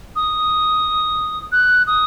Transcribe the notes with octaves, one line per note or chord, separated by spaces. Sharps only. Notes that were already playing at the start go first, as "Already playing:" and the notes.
D#6
F#6
D#6